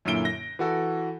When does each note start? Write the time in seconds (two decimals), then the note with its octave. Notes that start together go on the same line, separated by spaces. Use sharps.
0.05 F#2 A#2 D3 E4 D7 G7
0.25 A#6
0.59 E3 F#4 A4